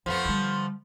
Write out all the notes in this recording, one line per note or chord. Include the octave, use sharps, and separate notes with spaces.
F2 F3 A3 B3
D3 G3